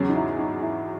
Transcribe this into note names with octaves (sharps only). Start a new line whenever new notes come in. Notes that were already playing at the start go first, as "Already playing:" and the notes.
Already playing: E2 C#3 F#3 C#4
D#4
E4
D#4
E4